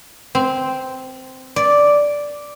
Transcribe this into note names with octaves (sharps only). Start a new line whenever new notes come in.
C4
D5